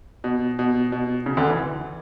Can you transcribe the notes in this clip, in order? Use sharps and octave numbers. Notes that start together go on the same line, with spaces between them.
B2
B2
B2
C#3
D2 D3
E3